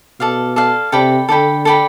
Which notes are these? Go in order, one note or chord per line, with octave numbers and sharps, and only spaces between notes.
B2 A4 D5 F5
A4 D5 F5
C3 A4 D5 G5 B5
D3 A4 D5 G5 B5
A4 D5 G5 B5